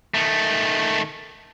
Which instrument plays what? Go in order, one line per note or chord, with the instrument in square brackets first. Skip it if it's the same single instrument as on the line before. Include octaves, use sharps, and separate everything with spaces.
[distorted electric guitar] D#3 A3